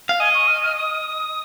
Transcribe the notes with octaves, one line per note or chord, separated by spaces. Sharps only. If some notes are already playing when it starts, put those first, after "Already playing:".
F5
D#5 G#5
C#6
F6
F6
D#6